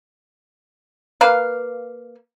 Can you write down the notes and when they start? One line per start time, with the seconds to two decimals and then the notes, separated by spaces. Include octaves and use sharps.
1.21 A#3 B4 F5